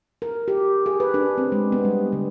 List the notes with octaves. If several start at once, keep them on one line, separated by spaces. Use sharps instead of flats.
A#4
G4
G#4
B4
D4
C4
G#3
B3
G3
D3